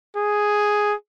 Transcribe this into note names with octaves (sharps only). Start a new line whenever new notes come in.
G#4